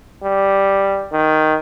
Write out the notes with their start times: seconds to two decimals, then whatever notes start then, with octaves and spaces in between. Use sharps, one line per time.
0.23 G3
1.12 D#3